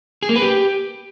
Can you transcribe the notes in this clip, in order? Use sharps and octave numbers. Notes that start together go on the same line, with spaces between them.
G#4
A#3
B4
G4